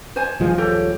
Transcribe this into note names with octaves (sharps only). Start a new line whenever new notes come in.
C5 G#5
D#1 F3 G#3
G4 A4 C#5